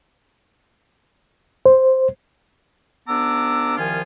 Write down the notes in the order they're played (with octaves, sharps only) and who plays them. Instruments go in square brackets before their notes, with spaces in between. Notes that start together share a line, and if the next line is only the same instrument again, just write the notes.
[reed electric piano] C5
[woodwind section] C#2 B3 D4 A#5 D6 E6
C2 D#3 F3 F4 G#5